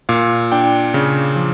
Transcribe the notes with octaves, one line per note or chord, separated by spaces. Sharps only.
A#2 F5
D4 G5
C#3
F3